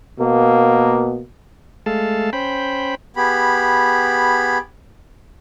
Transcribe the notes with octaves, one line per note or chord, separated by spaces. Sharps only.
B2 A#3
G#3 A3 A4 F5 A5
C#4 C5 G5 B5
B3 G4 G#4 B5